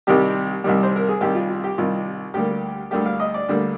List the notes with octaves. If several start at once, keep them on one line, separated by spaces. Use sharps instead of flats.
C2 C3 D#3 G3 G4
C2 C3 D#3 G3
C5
A#4
G#4
C2 C3 D#3 G3 G4
F4
F4
G4
C2 C3 D#3 G3 F4
D2 D3 G3 A#3 G4
D2 D3 G3 A#3 G4
F5
D#5
D5
D2 D3 G3 A#3